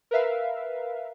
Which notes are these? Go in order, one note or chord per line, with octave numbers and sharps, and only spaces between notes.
A#4 B4 E5 F5